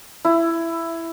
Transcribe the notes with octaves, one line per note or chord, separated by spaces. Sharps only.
E4